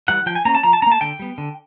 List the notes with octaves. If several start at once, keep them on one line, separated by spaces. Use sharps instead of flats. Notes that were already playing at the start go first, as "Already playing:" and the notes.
E3 G3 F#5
F3 G5
G#5
A#3 C#4 A#5
A5
F3 A#5
A5
C#4 A#5
A#3
A5
D3 G5
G3 B3
D3